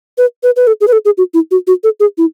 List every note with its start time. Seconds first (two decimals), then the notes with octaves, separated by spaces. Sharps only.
0.18 B4
0.43 B4
0.56 B4
0.67 A4
0.81 G#4
0.87 B4
0.92 A4
1.05 G#4
1.18 F#4
1.34 E4
1.51 F#4
1.67 F#4
1.84 A4
2.00 G#4
2.18 E4